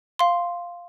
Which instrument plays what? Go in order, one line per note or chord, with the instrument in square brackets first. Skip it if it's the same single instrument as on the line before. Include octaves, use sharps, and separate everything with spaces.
[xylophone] F5 C6